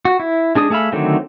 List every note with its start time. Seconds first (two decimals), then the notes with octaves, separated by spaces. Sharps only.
0.05 F#4
0.20 E4
0.55 G#3 D4 G#4 D#6
0.70 A3 G#4 E5 F5 B5
0.92 D3 D#3 F#3 A3 C4